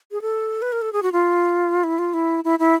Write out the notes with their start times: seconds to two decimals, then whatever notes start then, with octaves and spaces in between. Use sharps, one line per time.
0.11 G#4
0.21 A4
0.62 B4
0.72 A#4
0.82 A4
0.93 G#4
1.03 F#4
1.12 F4
1.84 E4
1.99 F4
2.14 E4
2.44 E4
2.59 E4